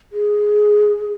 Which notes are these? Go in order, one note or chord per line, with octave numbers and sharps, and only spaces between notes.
G#4